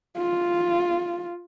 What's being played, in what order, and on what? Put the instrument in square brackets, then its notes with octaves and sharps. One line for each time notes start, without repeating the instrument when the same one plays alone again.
[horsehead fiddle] F4